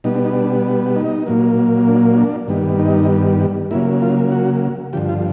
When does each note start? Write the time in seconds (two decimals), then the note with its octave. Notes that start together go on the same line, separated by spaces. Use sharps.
0.04 B2 G3 B3 D#4
0.14 D4
0.25 D#4
0.34 D4
0.96 D#4
1.26 A#2 F#3 A#3
1.88 D4
2.18 D4
2.48 G2 D#3 G3 B3
2.79 D#4
3.71 C#3 F#3 A#3 E4
4.02 F4
4.32 F#4
4.93 G2 D3 F3 G4
5.09 F4